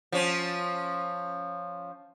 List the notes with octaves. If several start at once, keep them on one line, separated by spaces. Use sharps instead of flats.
F3 C#4